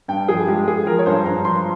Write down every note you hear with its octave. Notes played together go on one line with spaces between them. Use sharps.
G2 G5
F3 G#4
G#3 G4
G#3 G#4
F3 A#4
C#5
G2 C5
G2 A#5
F3 C6